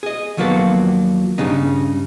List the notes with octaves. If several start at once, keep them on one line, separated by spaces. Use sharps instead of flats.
G#4 D#5
D#2 F3 F#3 A#3 B3 A4
G2 C#3 D4 D#4